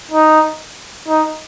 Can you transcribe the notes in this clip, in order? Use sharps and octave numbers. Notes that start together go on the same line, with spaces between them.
D#4
D#4